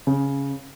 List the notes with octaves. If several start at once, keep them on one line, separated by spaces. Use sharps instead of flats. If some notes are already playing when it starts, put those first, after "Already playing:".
C#3